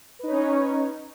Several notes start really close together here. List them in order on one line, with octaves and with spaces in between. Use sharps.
B4 D#4 C#5 C#4